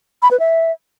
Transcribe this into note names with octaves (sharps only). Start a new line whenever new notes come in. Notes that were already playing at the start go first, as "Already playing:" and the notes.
B5
B4
E5